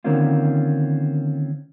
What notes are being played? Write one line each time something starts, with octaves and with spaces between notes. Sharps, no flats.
D3 D#3 A#3 C4 C#4 F4